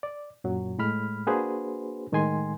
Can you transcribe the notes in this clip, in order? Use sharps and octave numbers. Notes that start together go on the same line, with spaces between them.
D5
F#2 A#2 F#3
A2 G#3 B5 F6
A#3 D4 F#4 G#4 B4 C5
A2 D#3 G#3 G#5 C6